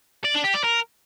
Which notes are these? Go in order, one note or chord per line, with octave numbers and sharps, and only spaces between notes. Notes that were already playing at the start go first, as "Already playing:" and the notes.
D5
D4
G4
D5
A#4